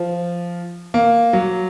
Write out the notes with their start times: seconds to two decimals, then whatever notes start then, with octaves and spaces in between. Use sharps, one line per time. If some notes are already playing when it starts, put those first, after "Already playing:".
Already playing: F3
0.94 A#3
1.33 F#3